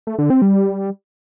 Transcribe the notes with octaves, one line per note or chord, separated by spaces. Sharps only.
A3
D3
C4
G3